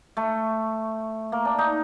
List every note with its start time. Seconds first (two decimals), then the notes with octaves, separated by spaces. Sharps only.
0.17 A3
1.32 A#3
1.45 D4
1.58 D#4